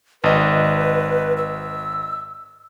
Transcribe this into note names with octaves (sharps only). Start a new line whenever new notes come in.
G#1 B4 D#5
E6